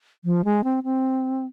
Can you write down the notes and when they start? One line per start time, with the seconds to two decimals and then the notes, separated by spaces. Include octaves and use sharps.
0.25 F3
0.45 G#3
0.64 C4
0.84 C4